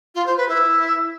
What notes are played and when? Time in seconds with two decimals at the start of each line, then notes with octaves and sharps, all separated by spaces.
0.15 F4
0.26 C5
0.37 B4
0.49 E4